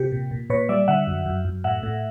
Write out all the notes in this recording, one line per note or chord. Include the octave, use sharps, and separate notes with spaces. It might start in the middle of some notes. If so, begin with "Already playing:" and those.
Already playing: C3 G4
A#2
A#2
A#2 B4 C#5
G3 D5 E5
D3 E5 F#5
F#2
F#2
F#2
A2 E5 F#5
A2